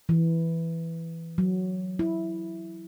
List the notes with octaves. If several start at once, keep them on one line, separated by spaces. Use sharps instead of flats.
E3
F#3
E4